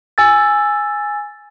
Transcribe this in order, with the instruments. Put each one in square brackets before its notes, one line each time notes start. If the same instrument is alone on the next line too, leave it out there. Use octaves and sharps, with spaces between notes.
[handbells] G#5 E6 A6